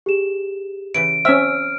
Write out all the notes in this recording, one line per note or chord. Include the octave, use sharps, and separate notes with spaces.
G4 G#4 E7
C#3 E3 E4 D7
C4 C#4 E5 E6 F6